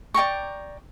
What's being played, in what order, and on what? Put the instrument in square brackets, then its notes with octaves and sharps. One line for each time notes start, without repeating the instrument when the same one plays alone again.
[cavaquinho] D5 G5 A#5 C#6